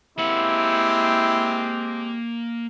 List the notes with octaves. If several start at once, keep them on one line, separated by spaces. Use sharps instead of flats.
G#3 A#3 C4 E4 G4 F#5